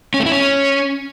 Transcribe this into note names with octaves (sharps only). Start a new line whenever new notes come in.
C#4
A3
E4
C#4